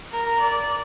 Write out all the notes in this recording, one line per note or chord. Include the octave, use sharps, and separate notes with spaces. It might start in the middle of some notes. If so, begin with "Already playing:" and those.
A#4
D5